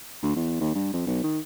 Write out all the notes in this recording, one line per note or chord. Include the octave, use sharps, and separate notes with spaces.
D2
E2
D#2
G2
F2
B1
D#3